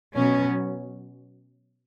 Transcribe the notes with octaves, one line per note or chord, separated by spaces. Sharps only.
B2 F#3 B3 C#4